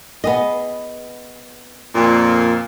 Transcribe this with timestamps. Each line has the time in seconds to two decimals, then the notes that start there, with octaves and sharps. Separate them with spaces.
0.24 B3 G#4 D#5
1.95 F2 A#2